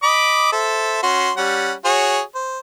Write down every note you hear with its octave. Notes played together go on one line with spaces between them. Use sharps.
D#5 B5 D6
A4 C5 E5
C#4 F#4 C6
G3 C#4 F#5
F#4 G#4 C#5
C5